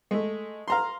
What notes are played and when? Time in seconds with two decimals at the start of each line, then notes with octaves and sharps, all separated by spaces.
0.11 G#3 A3
0.68 F5 A#5 C6